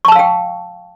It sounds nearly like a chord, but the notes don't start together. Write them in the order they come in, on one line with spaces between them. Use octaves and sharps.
C#6 A5 E6 F5 G5